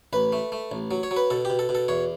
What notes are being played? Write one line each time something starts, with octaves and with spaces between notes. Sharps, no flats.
A1 B4
A3
A3
A1
F#3
C#5
F#3
B4
B2 A4
G4
B2
A4
B2
A4
E2 C#5